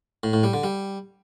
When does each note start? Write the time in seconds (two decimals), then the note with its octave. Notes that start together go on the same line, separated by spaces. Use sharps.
0.23 A2
0.33 A2
0.43 G3
0.53 D3
0.63 G3